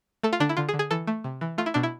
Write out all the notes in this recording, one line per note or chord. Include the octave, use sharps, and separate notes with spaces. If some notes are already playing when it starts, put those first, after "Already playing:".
A3 A4
F4
D3 D4
E4
D3 F4
G#4
D3
G#4
E3 A4
A3
C3
E3
A3 F4
E4
B2 D4
E4